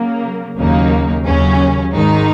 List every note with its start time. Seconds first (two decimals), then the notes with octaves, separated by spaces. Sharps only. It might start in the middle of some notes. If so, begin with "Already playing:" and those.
Already playing: C#3 F#3 A#3
0.57 D#2 C#3 F#3 A#3 D#4
1.25 D#2 C#3 F#3 C#4
1.94 G#2 D#3 G#3 D#4